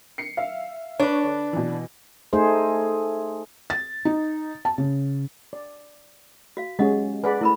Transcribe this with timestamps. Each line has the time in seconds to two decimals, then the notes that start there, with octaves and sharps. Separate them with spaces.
0.18 C7 C#7
0.37 E5 F5
1.00 D4 B4 C#5
1.24 D3
1.53 B2 E3
2.33 A3 D#4 G#4 C5
3.70 A6
4.05 D#4
4.65 A5
4.78 C#3
5.53 D5
6.57 F#4 F5
6.79 G#3 C#4 G4 G#4 D#5 F#5
7.24 G#4 B4 D5 F#5 G#5 B5
7.41 A3 E4 A#4 B5